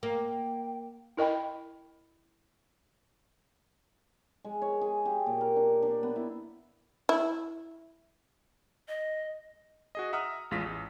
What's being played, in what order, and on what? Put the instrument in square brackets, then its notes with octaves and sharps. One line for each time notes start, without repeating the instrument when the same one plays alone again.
[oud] A#3 [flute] G5
[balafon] E4 A#4 D#5 G5 B5
[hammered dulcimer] G#3
C#5
G#4
G4
A#2
A#4
D4
D4
B3
E4
[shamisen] E4
[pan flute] D#5
[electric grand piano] F#4 G#4 D#5
E5 F#5 A#5 D#6 F6
A1 E2 G#3 F4 A#6 B6
A1